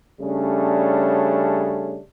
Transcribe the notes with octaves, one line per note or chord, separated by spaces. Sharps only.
C#3 G3 A3 C#4 D4